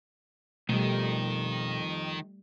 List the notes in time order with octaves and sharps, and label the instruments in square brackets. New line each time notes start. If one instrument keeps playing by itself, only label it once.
[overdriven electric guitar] F2 [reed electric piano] B2 [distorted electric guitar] D#3 [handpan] G3 A3